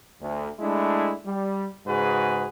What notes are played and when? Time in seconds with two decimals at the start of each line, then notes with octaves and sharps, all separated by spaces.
0.21 D2
0.60 G#3 A3 D4 E4
1.26 G3
1.87 G#2 C#3 F#4 G#4 B4